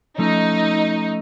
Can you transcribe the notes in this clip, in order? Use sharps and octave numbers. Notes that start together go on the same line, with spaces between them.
F3 A3 C#4 D#4